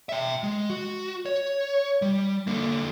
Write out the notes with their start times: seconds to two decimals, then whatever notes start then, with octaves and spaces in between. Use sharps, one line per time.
0.09 E5 G5
0.44 G#3
0.70 F#4
1.26 C#5
2.02 G3
2.47 D3 A#3